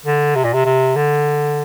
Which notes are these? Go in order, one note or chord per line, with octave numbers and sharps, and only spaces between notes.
D3
C3
A#2
C3
C3
D3